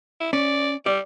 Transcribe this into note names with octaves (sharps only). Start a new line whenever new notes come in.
E4
C#4 D5
G3 D5